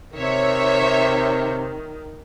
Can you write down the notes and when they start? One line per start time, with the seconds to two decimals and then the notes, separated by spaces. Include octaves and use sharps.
0.16 C3 D#3 C#5 E5